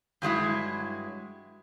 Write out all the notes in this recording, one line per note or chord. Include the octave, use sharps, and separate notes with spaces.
G2 F#3 G#3 E4